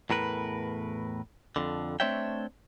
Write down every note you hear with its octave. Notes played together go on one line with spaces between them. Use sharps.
E2 A2 A#4 B4
F2 D3
A3 C4 D4 C#5 E5 G5